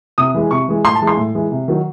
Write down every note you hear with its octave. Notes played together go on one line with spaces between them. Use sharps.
C3 D#6
E3 G#3
C3 C#6
E3 G#3
A2 C6
A5
E3 G#3
C6
A2
E3 G#3
C3
D#3 F#3